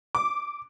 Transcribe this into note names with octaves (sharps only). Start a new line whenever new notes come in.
D6